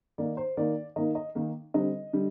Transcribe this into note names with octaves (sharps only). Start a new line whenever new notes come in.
D#3 A#3 D#4 D5
C5
D#3 A#3 D#4 D5
D#3 A#3 D#4 D#5
D#5
D#3 A#3 D#4
D3 G3 C4 D#5
D3 G3